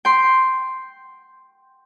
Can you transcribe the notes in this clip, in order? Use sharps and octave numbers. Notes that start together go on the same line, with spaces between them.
G5 C6